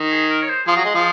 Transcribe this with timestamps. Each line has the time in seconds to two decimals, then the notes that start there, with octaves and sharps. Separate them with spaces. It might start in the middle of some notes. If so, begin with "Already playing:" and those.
Already playing: D#3
0.12 G#4
0.30 A#4
0.42 C#5
0.48 C5
0.66 F3 G#4
0.76 F#3
0.85 G#3
0.94 F3